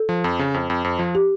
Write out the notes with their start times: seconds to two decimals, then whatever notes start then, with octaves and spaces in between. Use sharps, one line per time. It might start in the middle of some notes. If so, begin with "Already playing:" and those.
Already playing: A4
0.09 F3
0.24 F2
0.39 C#3
0.54 F2
0.70 F2
0.84 F2
0.99 F3
1.15 G4